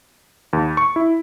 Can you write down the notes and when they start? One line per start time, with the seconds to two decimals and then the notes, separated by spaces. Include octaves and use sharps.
0.53 D#2
0.77 C#6
0.96 E4